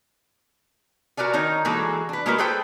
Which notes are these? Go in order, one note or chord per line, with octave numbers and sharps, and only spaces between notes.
F#4 A#4 B4 D5 G#5
D#3 D#4 A#4 C#5
E3 G#3 A#3 F#4 G#4 A4
D4 B4
G#3 A#3 E4 F#4 A#4 B4
G#4 A4 B4 C5 G5